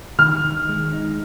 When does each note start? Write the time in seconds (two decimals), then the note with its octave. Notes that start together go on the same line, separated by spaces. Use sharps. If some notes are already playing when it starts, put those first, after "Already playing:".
0.19 D#3 F6
0.44 D#3
0.69 G#3
0.93 D#4